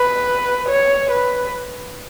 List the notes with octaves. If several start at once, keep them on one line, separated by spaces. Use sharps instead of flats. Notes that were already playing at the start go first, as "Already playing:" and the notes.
Already playing: B4
C#5
B4